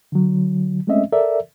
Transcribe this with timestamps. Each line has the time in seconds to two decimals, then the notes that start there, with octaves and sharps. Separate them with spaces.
0.12 D3 F#3
0.87 G#3 A3 C4 C#4 D#5 E5
1.12 A4 A#4 D5 E5